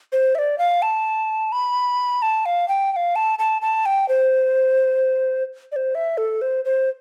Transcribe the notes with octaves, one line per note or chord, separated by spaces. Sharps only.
C5
E5
D5
F5
A5
B5
A5
F5
G5
G5
F5
A5
A5
A5
G5
C5
D5
C5
E5
A4
C5
C5